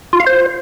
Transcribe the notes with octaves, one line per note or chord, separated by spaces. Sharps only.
F4
F5
C5